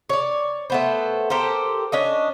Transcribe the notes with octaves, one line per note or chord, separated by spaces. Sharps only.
C#5 D5
A3 B3 C5
G4 A4 A#4 C5
C#4 D4 D#5